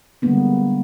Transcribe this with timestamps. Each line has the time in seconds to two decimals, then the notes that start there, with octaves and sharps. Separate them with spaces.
0.22 D3 G3 G#3 A#3 B3 D4